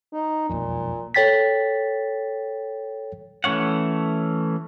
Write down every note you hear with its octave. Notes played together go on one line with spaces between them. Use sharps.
D#4
E1 B1 F2 A#2
A4 C#5 G5 A6 B6
E3 A3 C#4 C#5 F#5